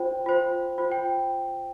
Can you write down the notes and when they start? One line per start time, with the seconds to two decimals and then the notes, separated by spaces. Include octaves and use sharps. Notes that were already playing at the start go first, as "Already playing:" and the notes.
Already playing: F4 C5 G5
0.26 F4 C5
0.78 F4 C5
0.92 G5